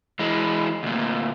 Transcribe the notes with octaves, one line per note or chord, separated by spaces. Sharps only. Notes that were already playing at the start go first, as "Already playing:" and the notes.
E3 G#3
D2 A#2